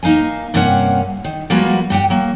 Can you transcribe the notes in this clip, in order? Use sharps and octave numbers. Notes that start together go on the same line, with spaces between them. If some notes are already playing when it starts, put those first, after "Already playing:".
A#3 D#4 F5 G#5
G2 C3 A#3 C#4 A4 F#5
D#3
F3 G3 G#3 A#3 F#4 B4
G2 G4 F#5 G5
F#3 A#3